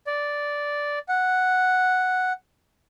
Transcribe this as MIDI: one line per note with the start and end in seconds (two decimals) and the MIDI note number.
0.07 0.99 74
1.09 2.33 78